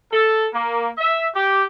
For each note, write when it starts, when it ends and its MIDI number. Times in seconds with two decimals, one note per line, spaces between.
0.11 0.46 69
0.53 0.89 58
0.98 1.26 76
1.34 1.63 67